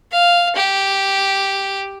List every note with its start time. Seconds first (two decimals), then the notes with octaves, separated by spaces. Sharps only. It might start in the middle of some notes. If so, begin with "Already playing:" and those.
0.11 F5
0.55 G4